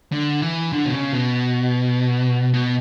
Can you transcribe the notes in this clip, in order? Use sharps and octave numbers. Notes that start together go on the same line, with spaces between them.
D3
E3
D3
B2
C#3
B2
B2